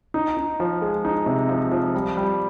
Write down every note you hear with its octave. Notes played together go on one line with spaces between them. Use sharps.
D#4
D#4
F3
G#3
D#4
C3
F3
F3
G3
G3